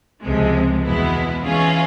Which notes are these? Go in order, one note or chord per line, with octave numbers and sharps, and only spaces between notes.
C#2 C3 F3 G#3
E2 B2 G#3 B3 E4
E3 G#3 C#4 F4 G#4